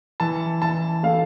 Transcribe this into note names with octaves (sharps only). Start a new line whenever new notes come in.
E3 A5
E3 A5
A3 F5